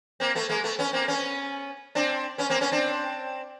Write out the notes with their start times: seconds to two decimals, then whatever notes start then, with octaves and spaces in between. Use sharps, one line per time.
0.20 A#3 C4
0.35 A3 B3
0.49 G#3 A#3
0.64 A3 B3
0.79 B3 C#4
0.93 A#3 C4
1.08 B3 C#4
1.95 C4 D4
2.38 B3 C#4
2.50 A#3 C4
2.61 B3 C#4
2.72 C4 D4